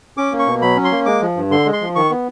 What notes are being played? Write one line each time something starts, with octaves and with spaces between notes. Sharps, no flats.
C#4 D6
A#3
C#6
B2
F#3 B5
C#4
C6
A#3
G#3 D6
F3
G2
D3 C6
G#3
C6
F3
D#3 C#6
B3